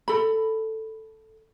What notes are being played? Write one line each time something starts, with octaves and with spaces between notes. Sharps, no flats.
A4 B5